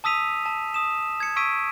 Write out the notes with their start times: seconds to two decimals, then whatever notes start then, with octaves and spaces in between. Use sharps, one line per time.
0.04 A5 D#6 E6 B6 D#7 F7
0.46 A5
0.74 D#6 E7
1.20 G#6 C#7
1.36 C#6 E6 B6 D7 D#7